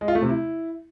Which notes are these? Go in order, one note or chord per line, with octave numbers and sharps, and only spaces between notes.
G#3
F4
A3
C3
E4